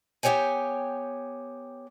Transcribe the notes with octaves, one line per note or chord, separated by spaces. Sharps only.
B3 G4 A4 C#5 G5 G#5